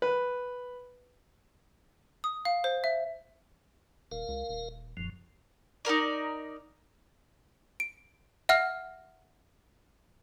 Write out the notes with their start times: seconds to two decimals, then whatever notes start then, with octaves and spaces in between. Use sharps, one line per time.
0.02 B4
2.24 D#6
2.45 F5
2.64 C5
2.84 E5
4.12 D#1 A#4 F5
4.28 C#2
4.49 D#1
4.97 D#1 F#2 F3
5.85 D#4 F4 A#4 D5
7.80 D7
8.49 E5 F#5 F6